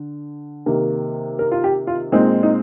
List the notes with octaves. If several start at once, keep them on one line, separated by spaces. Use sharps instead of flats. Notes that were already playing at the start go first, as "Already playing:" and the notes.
Already playing: D3
C3 D#3 A#3
A#4
F4
G4
F4
A#2 G#3 C4 D#4
D#4